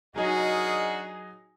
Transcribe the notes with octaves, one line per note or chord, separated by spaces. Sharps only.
F#3 D4 D#4 F#4 G#4 A#4 D#5